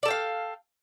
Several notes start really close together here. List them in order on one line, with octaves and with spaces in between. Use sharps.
D5 A4 G5 F5